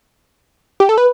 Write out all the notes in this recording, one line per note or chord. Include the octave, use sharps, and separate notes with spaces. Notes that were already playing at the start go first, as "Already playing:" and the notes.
G4
A4
B4